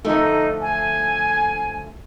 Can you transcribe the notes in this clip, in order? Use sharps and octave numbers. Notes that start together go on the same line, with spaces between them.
D3 F3 A3 D#4
G#5